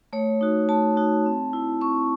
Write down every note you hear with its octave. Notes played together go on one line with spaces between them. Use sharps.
A3 C#5
D#4 F#4
A3 A5
D#4 F#4
C4
E4
C4 C#6